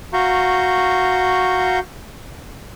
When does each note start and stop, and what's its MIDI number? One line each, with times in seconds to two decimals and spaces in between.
0.13 1.79 66
0.13 1.79 77
0.13 1.79 82
0.13 1.79 85
0.13 1.79 91